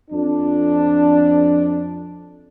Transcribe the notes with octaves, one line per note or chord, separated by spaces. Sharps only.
F2 D4